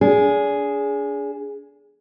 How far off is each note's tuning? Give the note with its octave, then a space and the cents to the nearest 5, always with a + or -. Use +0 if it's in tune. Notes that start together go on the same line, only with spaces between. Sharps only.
D4 -35 G#4 +0